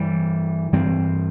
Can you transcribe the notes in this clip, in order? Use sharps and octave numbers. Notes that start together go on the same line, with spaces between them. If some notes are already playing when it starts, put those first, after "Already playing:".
Already playing: G2 E3 G3
G2 E3 G3 C4